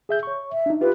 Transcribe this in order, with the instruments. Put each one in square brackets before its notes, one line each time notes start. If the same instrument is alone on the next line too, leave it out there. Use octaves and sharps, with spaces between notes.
[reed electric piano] G#4 E5 G6
C#5 C#6
[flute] E5
[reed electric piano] D4 D#4
[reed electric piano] F4 G4 [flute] B4